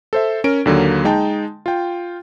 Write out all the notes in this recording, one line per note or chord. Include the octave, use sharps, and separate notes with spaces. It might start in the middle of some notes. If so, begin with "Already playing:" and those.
A4 C5 E5
C#4 A#4 D7
D#2 D3 F#3 A#3
G#3 D#4 G5 A5
F4 G5